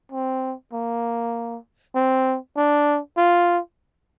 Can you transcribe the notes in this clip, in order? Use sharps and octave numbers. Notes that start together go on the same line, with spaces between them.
C4
A#3
C4
D4
F4